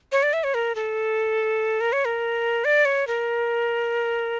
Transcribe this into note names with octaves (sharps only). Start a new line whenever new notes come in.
C#5
D5
E5
C#5
A#4
A4
A#4
C#5
A#4
D5
C#5
A#4